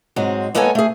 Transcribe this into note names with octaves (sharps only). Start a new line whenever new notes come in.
G#2 F#3 G#3 C4
G#3 A#3 B3 A4 C#5 G#5
A3 G#4